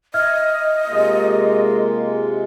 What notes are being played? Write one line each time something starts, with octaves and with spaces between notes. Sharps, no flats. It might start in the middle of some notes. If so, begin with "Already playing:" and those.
D#5 E5 F6 G#6
C3 G#3 A#3 F4